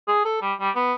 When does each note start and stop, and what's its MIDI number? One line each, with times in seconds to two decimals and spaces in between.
0.08 0.22 68
0.25 0.40 69
0.42 0.53 55
0.60 0.70 55
0.75 0.94 59